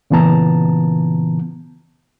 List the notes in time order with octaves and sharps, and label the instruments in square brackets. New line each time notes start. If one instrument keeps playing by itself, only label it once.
[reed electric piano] A#2 C#3 E3 B3 A5 A#5